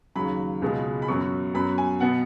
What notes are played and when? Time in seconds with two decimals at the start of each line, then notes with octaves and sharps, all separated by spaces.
0.16 D#2 C#3 F#3 B5
0.62 C#2 B2 G#3 B3
1.02 B5
1.08 F#2 F#3 B3 C#6
1.54 F#2 F#3 B3 B5
1.78 G#5
2.00 B2 B3 F#5